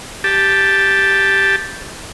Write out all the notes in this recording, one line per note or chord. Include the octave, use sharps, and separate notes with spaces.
G4 A5